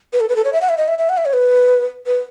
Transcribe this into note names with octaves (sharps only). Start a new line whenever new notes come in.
B4
A4
B4
A4
C#5
E5
F#5
E5
D#5
E5
E5
F#5
E5
C#5
B4
B4